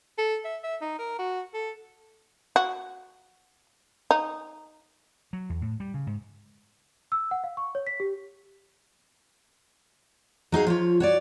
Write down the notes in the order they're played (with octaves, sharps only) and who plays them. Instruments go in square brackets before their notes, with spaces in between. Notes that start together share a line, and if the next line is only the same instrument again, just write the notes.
[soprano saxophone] A4
E5
E5
D#4
A#4
F#4
A4
[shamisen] F#4
D#4
[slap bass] F#3
E2
A2
G3
C#3
G#2
[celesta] E6
F#5
F5
C#6
C#5
B6
G4
[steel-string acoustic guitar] F#3 D#4 G#4 F5
F3 F4 C#5
F#4 C#5 D5